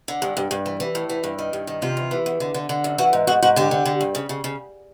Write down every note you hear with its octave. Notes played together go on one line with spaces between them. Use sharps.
D3
G2
G2
G2
E3
E3
A2
E3
G2
D#3
G2
D#3
C3 F4
E2
E3
E2
D3
D3
D3
F#2
E3 F#4
G#2
G#2 F#4
G#2 F#4
D3 G4
D3
D3
G2
C#3
C#3
C#3